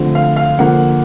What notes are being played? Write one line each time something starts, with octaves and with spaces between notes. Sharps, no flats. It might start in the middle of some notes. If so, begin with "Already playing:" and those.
Already playing: D3 F3 A3 C4
F5
F5
D3 F3 A#3 F#5